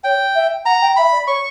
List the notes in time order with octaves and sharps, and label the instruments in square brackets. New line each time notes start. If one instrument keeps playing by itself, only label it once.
[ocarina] C#5 [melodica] G5
[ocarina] E5
[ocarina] F#5 [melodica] A#5
[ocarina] G5
[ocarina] E5 [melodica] B5
[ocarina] D5
[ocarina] C#5 [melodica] C#6